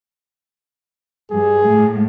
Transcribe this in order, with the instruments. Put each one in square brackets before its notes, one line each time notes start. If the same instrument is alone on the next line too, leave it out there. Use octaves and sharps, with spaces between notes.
[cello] G2 [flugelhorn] G#4
[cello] A2